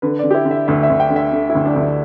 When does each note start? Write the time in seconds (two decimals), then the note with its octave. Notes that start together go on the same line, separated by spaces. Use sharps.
0.02 D3 B4
0.19 D3 D5
0.31 G4
0.34 E4
0.45 D3
0.51 E5
0.68 D2 E5
0.83 E5
0.90 D2
1.00 G5
1.10 D3
1.16 E5
1.32 D3
1.49 E4
1.55 D2
1.66 D4
1.75 D2
1.81 E4